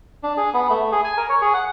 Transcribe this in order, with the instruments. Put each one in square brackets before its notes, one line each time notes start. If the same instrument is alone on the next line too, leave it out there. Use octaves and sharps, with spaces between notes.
[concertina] D4
G#4
B3
A3
G#4
G#5
A#4
C#5
G#4
F#5